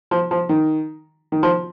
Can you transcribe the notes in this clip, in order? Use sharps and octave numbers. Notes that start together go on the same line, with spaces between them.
F3
F3
D#3
D#3
F3